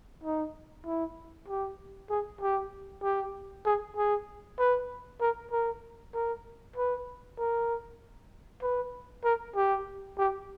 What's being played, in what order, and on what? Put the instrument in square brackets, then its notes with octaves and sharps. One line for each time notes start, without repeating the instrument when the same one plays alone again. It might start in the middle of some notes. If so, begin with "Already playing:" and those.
[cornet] D#4
E4
G4
G#4
G4
G4
G#4
G#4
B4
A#4
A#4
A#4
B4
A#4
B4
A#4
G4
G4